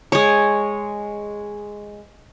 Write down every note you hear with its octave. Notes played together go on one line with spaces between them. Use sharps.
G#3 C#5